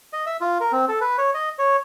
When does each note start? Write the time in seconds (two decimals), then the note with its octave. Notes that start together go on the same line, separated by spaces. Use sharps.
0.13 D#5
0.26 E5
0.41 F4
0.60 A#4
0.72 C4
0.88 A4
1.01 B4
1.18 C#5
1.34 D#5
1.59 C#5